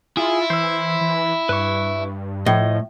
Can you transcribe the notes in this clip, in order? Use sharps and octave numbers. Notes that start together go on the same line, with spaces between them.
E4 F4 G#4
E3 C5 E6
E3
G2 B4 C#6
A2 F3 D#5